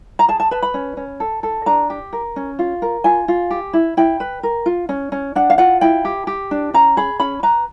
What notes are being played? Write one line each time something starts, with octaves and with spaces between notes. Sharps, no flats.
A#5
G#4 A5
A5
B4 A5
B5
C#4
C#4
A4
A4
D4 A#5
G4
A#4
C#4
F4
A#4
F4 G#5
F4
G4
E4
E4 G5
B4
A#4
F4
C#4
C#4
D4 F#5
F5
F4 F#5
E4 G5
G4
G4
D4
C#4 A#5
G#4 B5
C#4 B5
B4 A#5